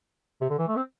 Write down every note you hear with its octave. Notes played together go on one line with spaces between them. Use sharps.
C3
D3
E3
A3
C4